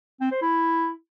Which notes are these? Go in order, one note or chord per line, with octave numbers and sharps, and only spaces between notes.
C4
C5
E4